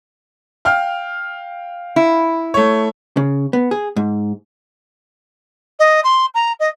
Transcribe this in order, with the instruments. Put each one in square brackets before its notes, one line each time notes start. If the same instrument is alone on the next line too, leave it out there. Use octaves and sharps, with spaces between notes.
[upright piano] F5 G5 F6
[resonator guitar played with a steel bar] E4
[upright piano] A3 C#5
[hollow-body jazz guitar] C#3
B3
G#4
G#2
[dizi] D#5
C6
A#5
D#5